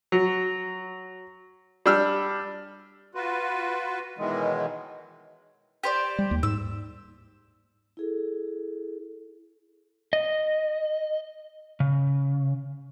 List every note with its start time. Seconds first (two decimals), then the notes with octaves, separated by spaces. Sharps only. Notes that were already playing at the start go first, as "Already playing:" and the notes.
0.12 F#3
1.86 G3 D4 E6 F6
3.15 F4 F#4 B4
4.18 B2 D#3 E3 F#3 G#3
5.83 G4 C5 D5
6.18 G3
6.31 D#2
6.43 G#2 E6
7.97 E4 G#4 A4
10.13 D#5
11.80 C#3